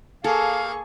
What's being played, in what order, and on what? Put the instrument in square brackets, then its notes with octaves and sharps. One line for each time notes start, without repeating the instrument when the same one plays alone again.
[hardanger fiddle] A#3 C#6 [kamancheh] G#4 [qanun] A4 [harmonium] F5